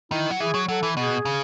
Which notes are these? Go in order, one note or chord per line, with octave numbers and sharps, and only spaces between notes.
D#3 E4
F#3
E3 G#4
F#3
F#3 A4
E3
B2 G#4
C#3